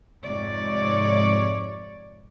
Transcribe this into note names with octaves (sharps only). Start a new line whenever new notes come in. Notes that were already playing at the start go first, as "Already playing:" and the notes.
F2 G#2 C3 C#5 D5